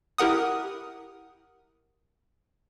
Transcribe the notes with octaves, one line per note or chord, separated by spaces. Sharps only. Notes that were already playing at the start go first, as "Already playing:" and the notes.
E4 G4 A#4 F#5 D#6